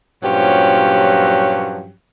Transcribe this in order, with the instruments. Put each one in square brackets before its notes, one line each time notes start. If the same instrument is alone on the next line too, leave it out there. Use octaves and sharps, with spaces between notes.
[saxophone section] G2 A#2 F3 F#3 C#4 G4